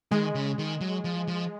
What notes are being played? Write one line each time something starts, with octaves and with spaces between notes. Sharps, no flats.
D#3 G#3
C#3
D#3
F#3
F3
F3